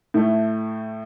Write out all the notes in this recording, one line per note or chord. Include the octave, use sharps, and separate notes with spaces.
A2 A3